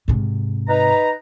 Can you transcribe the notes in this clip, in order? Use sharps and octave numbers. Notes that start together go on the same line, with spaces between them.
G#2 C3
D#4 B4 A#5